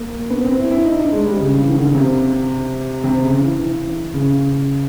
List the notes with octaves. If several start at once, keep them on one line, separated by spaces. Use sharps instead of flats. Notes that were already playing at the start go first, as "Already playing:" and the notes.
Already playing: A#3
B3
C4
E4
E4
D#4
D4
G#3
G3
C#3
E3
D#3
D3
C#3
C3
C3
C#3
E3
E3
C#3